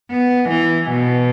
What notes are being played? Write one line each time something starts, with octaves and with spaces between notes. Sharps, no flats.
B3
E3
B2